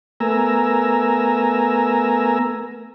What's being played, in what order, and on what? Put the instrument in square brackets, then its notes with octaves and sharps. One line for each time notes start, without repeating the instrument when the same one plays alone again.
[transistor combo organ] A3 B3 A#4 G#5 A#5 E6